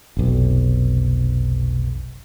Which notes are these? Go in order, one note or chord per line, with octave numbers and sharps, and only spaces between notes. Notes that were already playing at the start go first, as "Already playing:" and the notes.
F1 B1